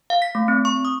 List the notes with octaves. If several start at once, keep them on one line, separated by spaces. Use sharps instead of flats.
F5
B6
A3
C4
C#6
D#6